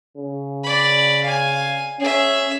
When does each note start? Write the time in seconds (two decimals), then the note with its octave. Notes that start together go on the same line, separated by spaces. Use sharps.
0.17 C#3
0.64 D5 B5
1.24 F5 G#5
2.00 C#4 G#4 E5